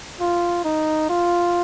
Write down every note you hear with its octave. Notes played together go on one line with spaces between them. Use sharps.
F4
D#4
F4